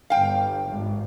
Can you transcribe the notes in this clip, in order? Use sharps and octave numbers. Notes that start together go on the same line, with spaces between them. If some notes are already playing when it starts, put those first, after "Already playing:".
G1 F5 G5
G#1